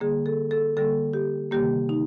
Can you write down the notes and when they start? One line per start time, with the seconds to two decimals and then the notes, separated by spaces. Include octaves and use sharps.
0.01 D3 G3 A#3 G#4
0.26 A4
0.51 A4
0.77 D3 G3 A#3 A4
1.13 G4
1.51 C3 D#3 G3 A#3 G4
1.89 D#4